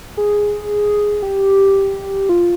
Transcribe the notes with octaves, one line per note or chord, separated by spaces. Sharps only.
G#4
G4
F4